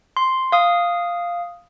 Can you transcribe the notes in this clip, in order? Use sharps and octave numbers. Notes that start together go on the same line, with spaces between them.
C6
F5 D#6